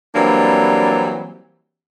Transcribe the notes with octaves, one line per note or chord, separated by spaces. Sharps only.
E3 F#3 G3 A#3 C4 D4